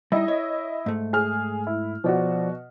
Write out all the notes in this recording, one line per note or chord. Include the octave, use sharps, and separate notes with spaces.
G3 D#4 E4 D#5
C#5
G#2 A3
G#4 F6
E4
B2 F3 F#4 D5